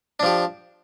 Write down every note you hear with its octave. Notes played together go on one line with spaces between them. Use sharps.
F3 D4 G4